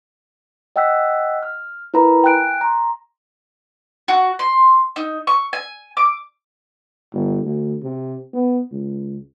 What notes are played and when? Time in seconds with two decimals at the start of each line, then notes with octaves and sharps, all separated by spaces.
0.76 D#5 F#5 G5 E6 F#6 B6
1.43 F6
1.94 E4 A#4 B4 A#5 B5
2.24 G5 G#5 F#6 D7
2.61 A#5 C6
4.08 F#4
4.39 C6
4.96 D#4
5.27 C#6
5.53 G#5
5.97 D6
7.13 G1
7.44 D2
7.83 C3
8.33 B3
8.71 C#2